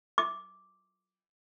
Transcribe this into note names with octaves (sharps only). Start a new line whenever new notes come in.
D6